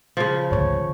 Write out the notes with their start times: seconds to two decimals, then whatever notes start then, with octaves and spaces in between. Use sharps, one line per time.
0.17 C#3 F3
0.51 D2 G#2 C#5